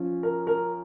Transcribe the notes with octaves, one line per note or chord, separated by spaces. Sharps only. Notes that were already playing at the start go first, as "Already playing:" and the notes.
Already playing: F3 C#4
A#4
A#4